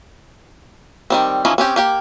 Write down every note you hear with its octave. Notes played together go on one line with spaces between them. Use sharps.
D#3 G3 C4
E3 F3 C#4 D#4 E4
C4 C#4 G4
A#3 G4 G5